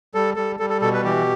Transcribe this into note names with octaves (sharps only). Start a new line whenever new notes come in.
G3 A4
G3 A4
G3 A4
A4
B2 A4
B4
E3 G4